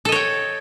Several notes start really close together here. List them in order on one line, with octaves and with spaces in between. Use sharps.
A4 D#5 C#5 G5